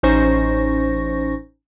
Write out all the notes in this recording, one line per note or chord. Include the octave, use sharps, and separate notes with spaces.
A1 C#4 D#4 C5 C#6 A#6